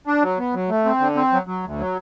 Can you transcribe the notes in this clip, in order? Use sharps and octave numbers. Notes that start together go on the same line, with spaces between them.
D4
F#3
B3
F#3
A3
C4
D3
C4
F#3
F#3
D2
F#3